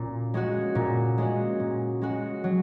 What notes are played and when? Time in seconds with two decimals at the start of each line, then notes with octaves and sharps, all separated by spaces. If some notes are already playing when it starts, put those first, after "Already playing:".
Already playing: A#2 C#4 F#4
0.34 G#3 C#4 F#4
0.75 A#2
1.18 G#3 C#4 F#4
1.60 A#2
2.02 G#3 C#4 F#4
2.44 F#3